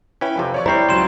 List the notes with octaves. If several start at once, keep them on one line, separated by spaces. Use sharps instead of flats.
C#4 E4 B4 G5
F2 C3
C#5 D5 C#6
G3 C4 E4 C5 A#5 C7
C#2 F#3 C6 E7